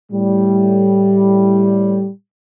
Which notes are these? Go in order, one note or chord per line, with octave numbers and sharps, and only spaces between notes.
A2 G3